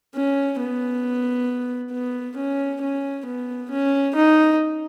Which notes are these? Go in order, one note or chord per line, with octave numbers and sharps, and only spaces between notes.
C#4
B3
B3
C#4
C#4
B3
C#4
D#4